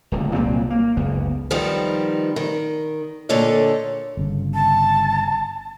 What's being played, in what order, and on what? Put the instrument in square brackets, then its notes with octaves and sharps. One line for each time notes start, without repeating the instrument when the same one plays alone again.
[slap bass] D1 C#2
C2 A#2 F#3 C4
A#3
F#1 C#2 B3
[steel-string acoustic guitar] D#3 F3 G3 B3 C4 D#4
D#3
A#2 D3 A4 C#5 D#5
[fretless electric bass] G1 C#3
[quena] A5